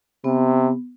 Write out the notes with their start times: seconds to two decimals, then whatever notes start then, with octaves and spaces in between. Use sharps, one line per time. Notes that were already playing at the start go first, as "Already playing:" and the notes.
0.24 C3 B3